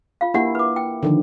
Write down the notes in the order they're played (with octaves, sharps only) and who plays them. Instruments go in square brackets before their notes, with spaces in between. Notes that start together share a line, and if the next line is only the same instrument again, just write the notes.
[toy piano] F4 F5
[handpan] A#3 E4 [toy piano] D4 G4 F#5
[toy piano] B4 D6
G5
[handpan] D3 D#3 F3